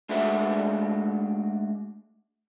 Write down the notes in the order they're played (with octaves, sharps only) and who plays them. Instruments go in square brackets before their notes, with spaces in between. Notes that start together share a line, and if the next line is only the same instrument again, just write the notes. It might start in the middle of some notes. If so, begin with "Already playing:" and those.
[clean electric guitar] G#3 A3 D4 F#4 G#4 E5